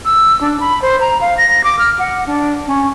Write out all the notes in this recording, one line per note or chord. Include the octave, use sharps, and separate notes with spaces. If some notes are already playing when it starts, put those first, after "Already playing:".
E6
D4
B5
C5
A#5
F5
A#6
D6
F6
F#5
D4
C#4